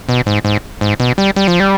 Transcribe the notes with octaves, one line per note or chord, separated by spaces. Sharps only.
B2
G#2
G#2
G#2
B2
G3
G3
F3
G3